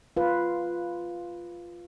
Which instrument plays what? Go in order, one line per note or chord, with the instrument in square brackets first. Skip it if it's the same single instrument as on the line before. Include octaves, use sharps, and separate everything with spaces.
[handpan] F4 B4